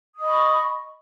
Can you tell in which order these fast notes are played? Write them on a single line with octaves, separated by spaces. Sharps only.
D#6 D#5 B5 C#6